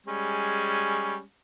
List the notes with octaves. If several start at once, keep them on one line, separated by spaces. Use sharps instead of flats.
G3 G#3 C#4